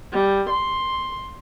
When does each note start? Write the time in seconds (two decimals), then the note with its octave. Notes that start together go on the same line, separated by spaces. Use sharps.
0.13 G3
0.49 C6